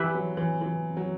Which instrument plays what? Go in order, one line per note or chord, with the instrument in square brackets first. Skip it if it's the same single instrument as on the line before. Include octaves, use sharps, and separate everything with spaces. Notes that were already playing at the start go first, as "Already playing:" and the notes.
Already playing: [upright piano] E3 [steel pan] G4 B4 E5
[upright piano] F#3
E3
E3
F#3